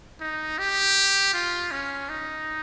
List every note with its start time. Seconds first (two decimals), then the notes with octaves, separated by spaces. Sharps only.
0.21 D#4
0.58 G4
1.34 F4
1.71 C#4
2.09 D#4